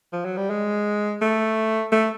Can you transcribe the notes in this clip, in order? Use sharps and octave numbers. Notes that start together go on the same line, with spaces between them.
F3
F#3
G3
G#3
A3
A3